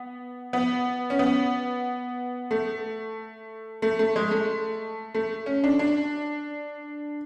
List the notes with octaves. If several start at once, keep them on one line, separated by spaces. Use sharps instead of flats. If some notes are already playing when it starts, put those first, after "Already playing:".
Already playing: B3
B3
C#4
B3
A3
A3
A3
G#3
A3
A3
C#4
D4
D4